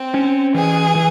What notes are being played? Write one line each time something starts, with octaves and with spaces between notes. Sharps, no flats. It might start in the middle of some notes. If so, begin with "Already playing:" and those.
Already playing: C4
C#4
E3 G#4
E3